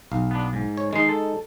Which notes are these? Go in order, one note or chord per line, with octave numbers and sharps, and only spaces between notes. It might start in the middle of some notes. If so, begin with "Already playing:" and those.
B1 F5
B3 D4
G#2
C#5
D#3 G#3 D#4 C6
A4